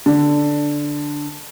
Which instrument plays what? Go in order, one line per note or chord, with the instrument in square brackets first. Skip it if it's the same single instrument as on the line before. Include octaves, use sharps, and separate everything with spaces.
[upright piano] D3